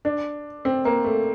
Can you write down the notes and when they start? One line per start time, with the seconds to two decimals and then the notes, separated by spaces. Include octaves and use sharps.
0.05 D4
0.65 C4
0.85 A#3
1.04 A3